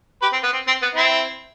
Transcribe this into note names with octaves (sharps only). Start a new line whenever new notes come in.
G4 B4
C4
B3
C4
C4
B3
C4 E4